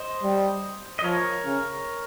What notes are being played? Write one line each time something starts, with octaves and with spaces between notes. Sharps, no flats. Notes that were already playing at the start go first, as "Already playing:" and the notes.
Already playing: C5 D#5
G3
D#5
F3 A#4 C#5
C#3